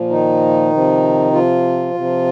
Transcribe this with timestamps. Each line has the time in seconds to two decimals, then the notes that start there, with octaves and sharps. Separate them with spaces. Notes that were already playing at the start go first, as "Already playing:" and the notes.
Already playing: A#2 F3
0.10 D#3 D#4
0.72 C3 F3
1.33 F3 F4
1.94 C3
1.99 F3